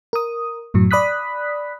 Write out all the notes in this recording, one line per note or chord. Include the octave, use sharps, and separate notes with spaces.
A#4 D#6
F#2 A2 F#3
D5 B5 D#6 F#6 B6